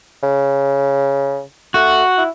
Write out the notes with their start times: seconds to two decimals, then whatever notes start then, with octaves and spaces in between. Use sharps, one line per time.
0.23 C#3
1.74 A3 F#4
2.17 E4